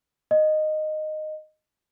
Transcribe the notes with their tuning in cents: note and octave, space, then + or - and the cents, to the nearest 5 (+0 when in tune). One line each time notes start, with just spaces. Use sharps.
D#5 -10